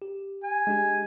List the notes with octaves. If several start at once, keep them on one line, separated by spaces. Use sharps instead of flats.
G4
G#5
G#3 D4 G4